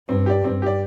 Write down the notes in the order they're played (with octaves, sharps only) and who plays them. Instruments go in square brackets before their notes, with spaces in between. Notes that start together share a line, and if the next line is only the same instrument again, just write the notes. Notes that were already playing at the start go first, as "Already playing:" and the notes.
[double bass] G2 [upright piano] C4
[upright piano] G4 D5
[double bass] G2 [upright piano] C4
[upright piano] G4 D5